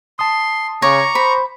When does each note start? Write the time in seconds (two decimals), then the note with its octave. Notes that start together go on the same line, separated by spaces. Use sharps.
0.19 A5 C6 D#6
0.82 C#3 C#5 A#5 C#6 D6 A#6
1.15 C5 B5